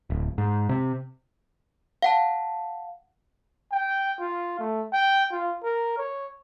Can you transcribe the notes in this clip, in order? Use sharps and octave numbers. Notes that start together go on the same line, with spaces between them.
D1
G#2
C3
F5 F#5 A5
G5
F4
A3
G5
F4
A#4
C#5